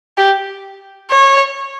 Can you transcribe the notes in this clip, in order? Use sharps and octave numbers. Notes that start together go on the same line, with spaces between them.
G4
C#5